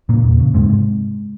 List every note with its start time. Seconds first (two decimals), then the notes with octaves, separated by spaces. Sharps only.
0.09 A#2 C#3 A#3
0.24 E2
0.40 C#3
0.54 G#2 C3 G#3